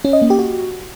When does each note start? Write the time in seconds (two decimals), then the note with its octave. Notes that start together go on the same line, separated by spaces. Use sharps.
0.05 C#4
0.13 D#5
0.22 A#3
0.30 G4
0.39 F#4